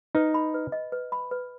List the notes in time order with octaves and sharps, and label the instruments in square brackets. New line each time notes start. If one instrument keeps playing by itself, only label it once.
[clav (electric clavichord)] D#4 [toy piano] B4
[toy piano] B5
B4
D#5
B4
B5
B4